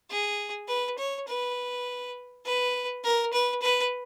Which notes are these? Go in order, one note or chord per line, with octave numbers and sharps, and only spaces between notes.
G#4
B4
C#5
B4
B4
A#4
B4
B4